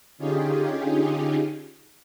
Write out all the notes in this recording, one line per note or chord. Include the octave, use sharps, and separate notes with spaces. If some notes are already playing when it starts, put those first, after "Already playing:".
D3 C#4 D#4 F4 G4 G#4